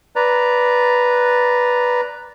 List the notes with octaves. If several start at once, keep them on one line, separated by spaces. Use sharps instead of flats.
B4 D5 A#5